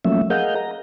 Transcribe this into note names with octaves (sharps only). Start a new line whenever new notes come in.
F3 F#3 A3 A#3 C#4 E5
G#4 A#4 D#5 F5 F#5 G6
A#5